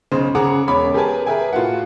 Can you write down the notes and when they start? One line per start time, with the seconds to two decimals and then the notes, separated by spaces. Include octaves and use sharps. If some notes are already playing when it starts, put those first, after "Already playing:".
0.12 B1 C#3 C5
0.35 C#3 G#4 F#5 A#5 D6
0.67 E1 C#4 C#5 B5 D6
0.94 G4 G#4 A#4 B4 G#5 A5
1.26 G#4 A#4 B4 E5 G5 G#5
1.53 A2 F4 F#4 F#5